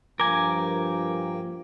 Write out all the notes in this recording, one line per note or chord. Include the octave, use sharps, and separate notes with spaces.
G2 F3 A#3 A#4 G5 G#5 D6